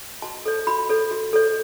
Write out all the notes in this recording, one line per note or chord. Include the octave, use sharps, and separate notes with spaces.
F#4 A5
A4 C#5
F#4 B5
A4 C#5
F#4
A4 C#5